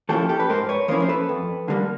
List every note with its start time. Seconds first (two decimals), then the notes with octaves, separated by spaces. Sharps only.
0.09 F3 A#3 C#4 E4 G4 A4
0.29 G4 A4
0.40 B4
0.49 G#2 A#4 C5
0.69 B4 C#5
0.88 F3 A#3 C#4 E4 A#4 C5
1.02 C5
1.09 A4 B4
1.29 F2
1.68 D3 G3 A#3